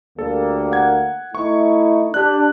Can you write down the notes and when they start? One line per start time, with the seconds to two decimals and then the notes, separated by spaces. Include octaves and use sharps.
0.19 D2 G3 A#3 A4
0.72 F#5 G#6
1.35 A3 D#4 E4 C#6
2.14 D4 G4 F#6